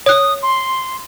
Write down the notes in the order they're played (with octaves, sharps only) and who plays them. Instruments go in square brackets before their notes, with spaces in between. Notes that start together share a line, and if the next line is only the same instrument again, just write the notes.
[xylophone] C#5 F#6 [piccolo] D#6
[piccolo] C6